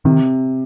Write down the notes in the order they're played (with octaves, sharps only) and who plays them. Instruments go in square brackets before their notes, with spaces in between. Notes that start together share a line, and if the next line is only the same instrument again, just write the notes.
[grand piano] C3 [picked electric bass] D#3